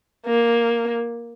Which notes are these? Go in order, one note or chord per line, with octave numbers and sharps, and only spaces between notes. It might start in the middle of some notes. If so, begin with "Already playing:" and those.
A#3